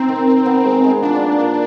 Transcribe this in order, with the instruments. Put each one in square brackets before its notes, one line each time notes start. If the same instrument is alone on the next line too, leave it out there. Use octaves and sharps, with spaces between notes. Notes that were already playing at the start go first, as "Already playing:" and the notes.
Already playing: [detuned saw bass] C4 [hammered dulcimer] D#4
[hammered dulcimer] D#3
D#3
B3
G#3
G#3
[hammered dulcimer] F3 [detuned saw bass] D4
[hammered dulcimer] A#3
A#2